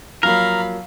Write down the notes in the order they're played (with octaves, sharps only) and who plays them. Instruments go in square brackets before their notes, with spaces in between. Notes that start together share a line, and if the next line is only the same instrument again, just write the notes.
[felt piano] F3 F#3 A#3 [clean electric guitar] A#4 [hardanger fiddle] F5 B5